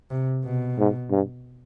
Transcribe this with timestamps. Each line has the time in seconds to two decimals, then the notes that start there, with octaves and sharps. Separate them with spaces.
0.11 C3
0.45 B2
0.78 G#2
1.11 G2